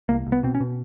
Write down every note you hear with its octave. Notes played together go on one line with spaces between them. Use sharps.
C2 A#3
C2
B3
B2 C4
C#4
B2